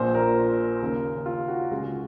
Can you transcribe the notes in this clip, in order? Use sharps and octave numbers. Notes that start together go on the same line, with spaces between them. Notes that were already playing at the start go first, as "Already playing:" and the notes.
Already playing: A#1 A#2 C5
A#4
D#2 C#3
F4
F#4
C#2 C#3 G#4